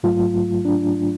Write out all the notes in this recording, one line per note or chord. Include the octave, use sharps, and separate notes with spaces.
G#2 F#3 A3 F4
D4